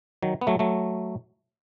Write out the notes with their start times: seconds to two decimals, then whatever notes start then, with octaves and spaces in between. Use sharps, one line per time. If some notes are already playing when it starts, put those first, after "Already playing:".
0.23 D#3 F#3
0.41 B3
0.47 F#3 A3
0.59 F#3 A3